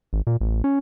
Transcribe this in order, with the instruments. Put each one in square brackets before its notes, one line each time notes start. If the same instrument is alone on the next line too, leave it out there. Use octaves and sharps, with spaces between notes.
[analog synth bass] G#1
A#2
A1
C#4